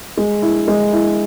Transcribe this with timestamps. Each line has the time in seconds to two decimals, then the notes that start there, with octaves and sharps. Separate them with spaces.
0.17 G#3
0.42 E4
0.68 G#3
0.93 E4